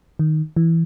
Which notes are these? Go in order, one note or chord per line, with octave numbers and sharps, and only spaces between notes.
D#3
E3